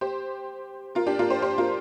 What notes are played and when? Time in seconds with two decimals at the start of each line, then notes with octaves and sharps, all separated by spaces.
0.01 G4 C5
0.95 F4 A#4
1.06 D4 G4
1.19 F4 A#4
1.30 G4 C5
1.42 G4 C5
1.58 F4 A#4